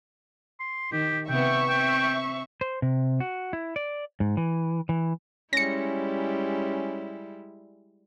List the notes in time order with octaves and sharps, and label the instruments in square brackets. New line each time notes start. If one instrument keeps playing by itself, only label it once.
[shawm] C6
[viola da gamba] D#3 [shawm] G4
[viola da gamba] C3 B3 [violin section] E5 C#6 [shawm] G5
[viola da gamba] C4 [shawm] G5
[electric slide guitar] C5
C3
F#4
E4
D5
G#2
E3
E3
[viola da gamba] G3 G#3 E4 [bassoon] C#4 [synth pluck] A#6 C#7